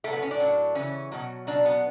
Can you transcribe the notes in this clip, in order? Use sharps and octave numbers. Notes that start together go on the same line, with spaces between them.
A2 F#3 A3
B3
C#4
D4
A2 F#3
C#3 E3 C#4
B2 F#3
B2 F#3 D4
B3